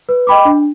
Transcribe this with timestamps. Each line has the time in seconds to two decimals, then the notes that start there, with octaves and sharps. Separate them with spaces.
0.09 B4
0.27 D#5 G5 B5 D6
0.45 D4